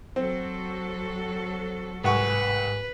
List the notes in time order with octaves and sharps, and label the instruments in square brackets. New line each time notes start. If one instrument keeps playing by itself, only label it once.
[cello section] F#3 F#4 A4 [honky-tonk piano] C4
[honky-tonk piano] C2 F#5 C#6 [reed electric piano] G#2 G#5 [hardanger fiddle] B4